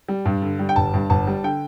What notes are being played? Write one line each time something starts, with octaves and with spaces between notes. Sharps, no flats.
G3
G2
D3
G3
G5
G1 A5
G2
G1 A5
G3
D3 G5